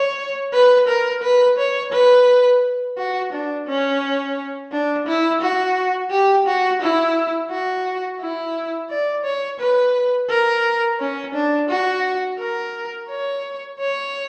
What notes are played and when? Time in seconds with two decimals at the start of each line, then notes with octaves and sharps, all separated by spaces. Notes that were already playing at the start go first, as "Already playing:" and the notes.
Already playing: C#5
0.53 B4
0.88 A#4
1.23 B4
1.58 C#5
1.92 B4
2.98 F#4
3.33 D4
3.67 C#4
4.72 D4
5.07 E4
5.42 F#4
6.11 G4
6.47 F#4
6.82 E4
7.51 F#4
8.21 E4
8.90 D5
9.25 C#5
9.60 B4
10.29 A#4
11.00 C#4
11.34 D4
11.70 F#4
12.40 A#4
13.09 C#5
13.79 C#5